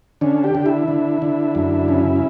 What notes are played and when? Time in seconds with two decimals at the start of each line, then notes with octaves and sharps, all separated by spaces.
0.21 D3 C#4
0.44 G4
0.55 D3
0.66 E4
0.88 D3
1.22 D3
1.55 F#2
1.88 C#3